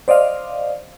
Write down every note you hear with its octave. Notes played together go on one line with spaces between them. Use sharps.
C5 D5 D#5 F5